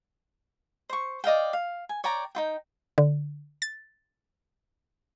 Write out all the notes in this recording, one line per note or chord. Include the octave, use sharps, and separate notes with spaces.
C5 C#6
D5 D#5 F5 G5
F5
G#5
C#5 D5 G5 A#5
D#4 F4 G5
D3
A6